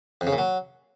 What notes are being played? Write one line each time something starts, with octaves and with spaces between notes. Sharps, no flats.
F2
C#3
A#2
F#3